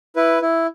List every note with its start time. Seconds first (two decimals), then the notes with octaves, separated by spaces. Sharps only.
0.16 E4 B4
0.42 E4